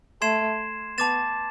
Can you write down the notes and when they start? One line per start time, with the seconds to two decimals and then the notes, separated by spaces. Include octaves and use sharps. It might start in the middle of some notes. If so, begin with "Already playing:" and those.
0.22 A3 C6 G#6 C7 E7
0.98 B3 A5 D6 A6 E7